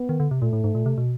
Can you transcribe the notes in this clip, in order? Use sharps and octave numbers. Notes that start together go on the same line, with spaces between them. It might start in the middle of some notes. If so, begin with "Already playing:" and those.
Already playing: B3
D#3
D3
C3
A#2 A3
A2
G#2
A#2
C3
B2